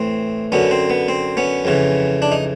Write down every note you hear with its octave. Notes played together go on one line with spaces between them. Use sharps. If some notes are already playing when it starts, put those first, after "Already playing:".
Already playing: A2 E3 C4
F#2 D3 B3 C#4
C4
B3
C4
B3 C#4
F2 C#3 E3
D4
D#4